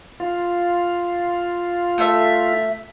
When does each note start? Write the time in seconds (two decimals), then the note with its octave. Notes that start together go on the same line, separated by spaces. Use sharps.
0.20 F4
1.98 A3 E5